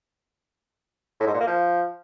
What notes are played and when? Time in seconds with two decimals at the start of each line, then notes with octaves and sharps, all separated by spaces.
1.20 A2
1.27 G#2
1.34 A#2
1.41 A#3
1.47 F3